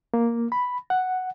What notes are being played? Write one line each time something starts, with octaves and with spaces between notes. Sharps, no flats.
A#3
B5
F#5